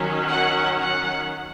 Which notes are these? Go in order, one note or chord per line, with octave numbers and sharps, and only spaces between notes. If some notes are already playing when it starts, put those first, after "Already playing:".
Already playing: D#3 F#3 C#4
F#5
F#5